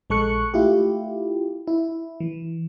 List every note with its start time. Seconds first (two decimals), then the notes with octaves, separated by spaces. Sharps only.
0.10 A#1 G#3 A4 C#6 F#6 C#7
0.54 A3 E4 F4 G4
1.67 E4
2.20 E3